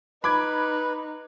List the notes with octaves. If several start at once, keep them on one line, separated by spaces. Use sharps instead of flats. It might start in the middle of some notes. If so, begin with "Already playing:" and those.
D#4 B4 B5 D6 G#6